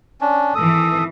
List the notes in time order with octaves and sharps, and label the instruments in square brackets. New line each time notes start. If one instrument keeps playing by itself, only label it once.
[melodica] C#4 D4
[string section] G#1 E3 [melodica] A4 D#6